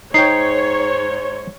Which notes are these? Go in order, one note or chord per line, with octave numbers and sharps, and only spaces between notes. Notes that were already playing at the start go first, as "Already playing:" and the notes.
G#2 D#4 C5 C#5 G5 C7